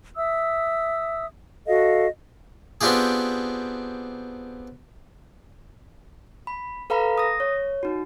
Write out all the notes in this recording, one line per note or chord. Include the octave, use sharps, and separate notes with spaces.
E5 D#6 E6
F#4 A4 D#5 F5
B3 C4 D4 F4 G4 G#4
B5
A4 B4 F5 A#5 B5
D#6 A#6
C#5
D#4 F#4